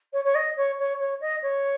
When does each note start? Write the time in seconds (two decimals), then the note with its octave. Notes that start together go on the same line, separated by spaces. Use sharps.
0.13 C#5
0.24 C#5
0.34 D#5
0.56 C#5
0.78 C#5
0.99 C#5
1.21 D#5
1.42 C#5